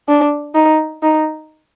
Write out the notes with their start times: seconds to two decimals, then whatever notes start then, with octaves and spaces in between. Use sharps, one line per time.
0.08 D4
0.55 D#4
1.03 D#4